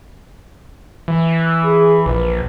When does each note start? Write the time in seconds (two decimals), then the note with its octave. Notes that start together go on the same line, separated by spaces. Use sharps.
1.08 E3
1.65 G#4
2.06 A#1 B4